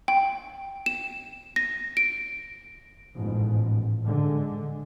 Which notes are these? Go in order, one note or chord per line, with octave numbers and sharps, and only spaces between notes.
G5
E7
A#6
D7
A1 G#2 B2 F3
D3 G#3